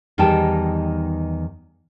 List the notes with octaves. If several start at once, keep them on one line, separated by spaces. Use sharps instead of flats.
E2 D#3 G3 D#4 G5 A5